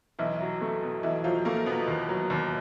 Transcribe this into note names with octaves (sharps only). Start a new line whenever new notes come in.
B1 E3 E4
F#3
A3
B2
B1 E3 E4
F3 F#3 F4
A3 A#3 A#4
B2 B3 B4
D#2
F#3
D#2